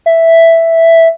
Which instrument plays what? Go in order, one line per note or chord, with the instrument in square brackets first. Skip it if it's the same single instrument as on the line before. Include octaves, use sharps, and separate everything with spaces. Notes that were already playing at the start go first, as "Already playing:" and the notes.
[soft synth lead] E5